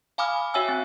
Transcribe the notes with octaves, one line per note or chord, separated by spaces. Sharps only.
F5 G#5 B5 D6 D#6 F6
F#4 C#5 E5 G5 G#5 E6
C4